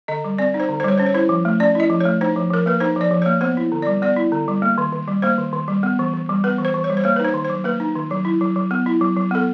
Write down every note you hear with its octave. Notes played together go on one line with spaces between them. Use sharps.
D3 D#5
G3
C4 D5
D#4
C5
D3
C5
G3 C#5
C#4 C5
C#5
E4 C5
F3
A3
C#4 D5
E4 D#5
F3
A3 C#5
D#4 C5
F3
F3 A#4
A#3 B4
D#4 C5
F3 D5
F3
A#3 C#5
B3 C5
E4
D3
G3 D5
B3 D5
E4
D3
G3
A#3
D#3
D#3
G3
A#3 C5
D#3
D#3
G3
B3
E3
E3
G3
B3 B4
E3
C5
E3
C#5
G3
C5
A#3 C#5
B4
D#4 C5
D#3
C5
F#3
A#3 B4
D#4
D#3
F#3
E4
F#3
F#3
B3
E4
F#3
F#3
B3 A4